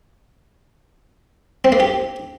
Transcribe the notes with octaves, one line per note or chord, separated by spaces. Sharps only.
C4
A#3
G4